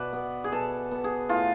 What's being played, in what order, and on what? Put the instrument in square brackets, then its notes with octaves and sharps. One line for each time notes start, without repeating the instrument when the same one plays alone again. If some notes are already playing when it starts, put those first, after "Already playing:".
Already playing: [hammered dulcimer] B2 B4 D5 E5
B3
G#4
B2 A4
B3
G#4
A2 F4